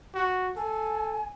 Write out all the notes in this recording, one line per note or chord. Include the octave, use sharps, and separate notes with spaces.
F#4
A4 G#5